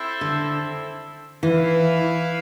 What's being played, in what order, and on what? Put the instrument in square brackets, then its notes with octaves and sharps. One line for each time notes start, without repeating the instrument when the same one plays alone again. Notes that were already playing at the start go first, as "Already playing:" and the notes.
Already playing: [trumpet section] C4 E4 A4 C5
[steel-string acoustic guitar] D3
[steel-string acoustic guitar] E3 [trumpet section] E4 B4 F5